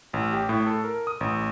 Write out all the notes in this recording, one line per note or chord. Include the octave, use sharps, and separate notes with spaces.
A1
G4
A2
A4
A#4
D#6
A1